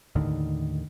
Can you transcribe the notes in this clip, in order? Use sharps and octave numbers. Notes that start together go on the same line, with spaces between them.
D#2 A2 D3 D#3